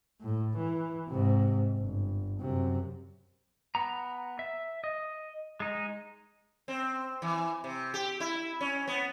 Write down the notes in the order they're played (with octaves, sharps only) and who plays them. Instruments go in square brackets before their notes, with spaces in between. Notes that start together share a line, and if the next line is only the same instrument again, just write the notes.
[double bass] A2
E3
G#2 C3
G1
F#2 C3
[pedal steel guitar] B3 A#5
E5
D#5
G#3 D#4
[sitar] C4
E3
C3
G4
E4
C#4
B3